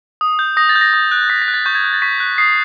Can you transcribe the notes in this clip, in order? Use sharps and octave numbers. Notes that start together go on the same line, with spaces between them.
D#6
G6
D#6 A#6
A6
G6
A#6
D#6
F#6
D#6 B6
A#6
F#6
A6
C#6 G6
G#6
F#6
A6
C#6 B6
F#6
D#6 C7